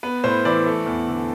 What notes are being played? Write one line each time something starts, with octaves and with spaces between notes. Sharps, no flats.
B3 B4
A2 C5
E3 D5
A3
E2
D3